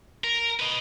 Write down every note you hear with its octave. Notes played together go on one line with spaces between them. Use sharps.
A#4
B4 D#5